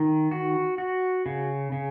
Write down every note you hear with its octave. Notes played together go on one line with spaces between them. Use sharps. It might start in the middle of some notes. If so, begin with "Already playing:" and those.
Already playing: D#3
F#4
F#4
C#3
C#3